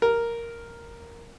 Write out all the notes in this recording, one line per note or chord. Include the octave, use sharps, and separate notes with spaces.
A#4